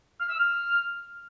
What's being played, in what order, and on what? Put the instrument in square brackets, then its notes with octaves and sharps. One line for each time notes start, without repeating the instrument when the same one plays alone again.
[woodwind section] F6
E6
F6